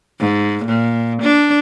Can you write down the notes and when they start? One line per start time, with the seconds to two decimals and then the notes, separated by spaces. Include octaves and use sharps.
0.20 G#2
0.65 A#2
1.22 D4